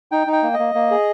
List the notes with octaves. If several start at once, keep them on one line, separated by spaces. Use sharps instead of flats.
D#4 G5
D#4
G5
A#3
D#5
A#3
A#3
G#4